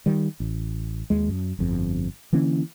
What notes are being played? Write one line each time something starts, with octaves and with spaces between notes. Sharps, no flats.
D#3 G3
A1
D#2 G#3
F#2
G1 F2
D3 E3 A#3 C#4